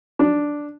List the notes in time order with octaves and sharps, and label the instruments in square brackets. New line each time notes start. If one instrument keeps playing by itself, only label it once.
[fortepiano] D4